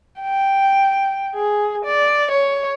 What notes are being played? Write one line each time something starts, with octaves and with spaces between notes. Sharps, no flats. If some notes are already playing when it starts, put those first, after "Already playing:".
G5
G#4
D5
C#5